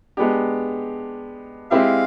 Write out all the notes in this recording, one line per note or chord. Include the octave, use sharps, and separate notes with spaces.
G#3 B3 D4 G4
G#3 C4 E4 G4 F5